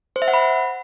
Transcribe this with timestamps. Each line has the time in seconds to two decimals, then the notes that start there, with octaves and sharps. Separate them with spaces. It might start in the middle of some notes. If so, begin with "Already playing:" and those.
0.16 C5
0.22 E5
0.28 F#5
0.34 B5